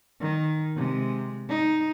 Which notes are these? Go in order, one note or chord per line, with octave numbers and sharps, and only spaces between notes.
D#3
C3 G#3
D#4